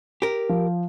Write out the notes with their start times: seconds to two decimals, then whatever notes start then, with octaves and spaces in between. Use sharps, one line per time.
0.22 G4 A#4
0.49 F3